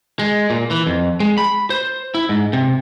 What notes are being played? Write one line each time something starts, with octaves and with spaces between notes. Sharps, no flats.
G#3
A#2
E3
F2
G#3
B5
C5
E4
G#2
C3